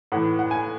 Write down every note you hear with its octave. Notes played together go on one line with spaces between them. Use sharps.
A2 E3 F#5
F#5
G#5